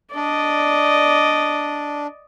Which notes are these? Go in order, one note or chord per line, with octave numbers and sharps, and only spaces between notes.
D4 D5 D#5